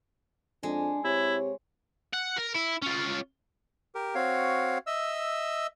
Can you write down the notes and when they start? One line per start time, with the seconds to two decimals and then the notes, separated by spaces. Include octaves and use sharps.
0.63 F2 G#3 D4
1.05 C3 E4 C#5
2.13 F#5
2.38 A#4
2.55 E4
2.82 C#4 F4
3.95 G4 A#4
4.15 C4 F#4 C#5 F5
4.87 D#5 E5 E6